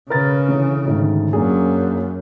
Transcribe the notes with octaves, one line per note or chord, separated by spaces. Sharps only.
C#3 A#4 B4 A6
D3 E3 C#4
D2 G#2 D#3
F#2 A#3 D4 G#4